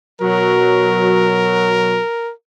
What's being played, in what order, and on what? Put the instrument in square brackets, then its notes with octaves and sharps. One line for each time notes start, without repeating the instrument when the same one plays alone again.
[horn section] B2 F#3 [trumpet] A#4